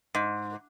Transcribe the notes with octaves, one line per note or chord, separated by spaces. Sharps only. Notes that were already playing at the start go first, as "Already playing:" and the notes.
G#2